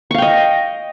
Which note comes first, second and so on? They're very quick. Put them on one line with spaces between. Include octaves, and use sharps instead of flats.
C#6 F5 G5 D#5